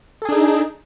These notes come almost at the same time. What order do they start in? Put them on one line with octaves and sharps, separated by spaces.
A4 G#4 D4 D#4